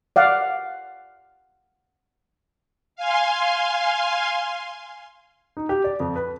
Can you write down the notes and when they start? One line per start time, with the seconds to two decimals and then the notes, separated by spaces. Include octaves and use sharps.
0.16 D5 F5 F#5
2.96 F5 G#5 C6
5.57 D#4
5.69 G4
5.84 D5
6.00 F2
6.16 B4